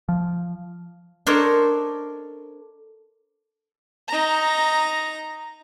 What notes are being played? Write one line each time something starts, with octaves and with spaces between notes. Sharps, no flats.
F3
D4 A4 A#4 C5 C#5 D#5
D#4 A#5